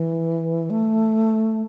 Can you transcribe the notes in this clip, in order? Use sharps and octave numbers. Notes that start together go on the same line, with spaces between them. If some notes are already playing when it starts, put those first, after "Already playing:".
Already playing: E3
A3